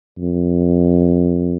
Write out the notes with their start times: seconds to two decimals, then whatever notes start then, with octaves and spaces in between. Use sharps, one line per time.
0.18 F2